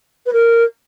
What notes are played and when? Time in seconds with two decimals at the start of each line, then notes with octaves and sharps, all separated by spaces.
0.25 B4
0.32 A#4